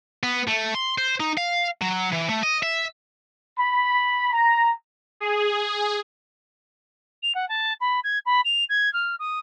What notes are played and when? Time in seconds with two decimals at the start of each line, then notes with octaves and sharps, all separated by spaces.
0.23 B3
0.48 A3
0.74 C6
0.98 C5
1.20 D#4
1.38 F5
1.81 F#3
2.12 E3
2.29 A3
2.43 D#5
2.63 E5
3.58 B5
4.32 A#5
5.20 G#4
7.23 F7
7.35 F#5
7.49 A5
7.81 B5
8.04 G#6
8.26 B5
8.45 F7
8.69 G#6
8.93 F6
9.19 D#6